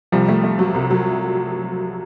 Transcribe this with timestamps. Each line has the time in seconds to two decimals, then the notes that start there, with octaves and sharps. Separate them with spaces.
0.12 C2 F3 G3
0.28 A3
0.44 A3
0.59 F#3
0.74 C2
0.91 F#3